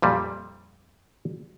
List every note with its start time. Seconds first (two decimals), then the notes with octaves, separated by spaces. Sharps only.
0.02 F2 A#2 G3